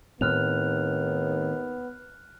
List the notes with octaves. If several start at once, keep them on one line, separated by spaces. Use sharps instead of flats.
D#2 A2 D#3 B3 C4 F6 F#6 F7